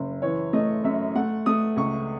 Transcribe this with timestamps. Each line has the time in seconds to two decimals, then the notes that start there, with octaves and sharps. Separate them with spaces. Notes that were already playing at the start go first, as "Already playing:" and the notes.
Already playing: F#1
0.22 E3 C#5
0.53 A3 D#5
0.84 F#2 E5
1.15 A3 F#5
1.46 A3 D#6
1.76 C#2 C#6